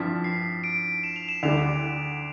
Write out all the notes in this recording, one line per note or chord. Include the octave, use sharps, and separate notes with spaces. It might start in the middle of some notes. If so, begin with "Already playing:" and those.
Already playing: G2 F3 C4 E4 B6
C7
D7
E7
F7
E7
D2 D3 G3 F7